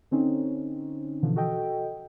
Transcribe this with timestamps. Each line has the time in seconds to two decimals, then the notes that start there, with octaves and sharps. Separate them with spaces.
0.11 D3 C4 C#4 D#4
1.23 B2 D3 E3 F3
1.36 F#4 A4 D#5 G5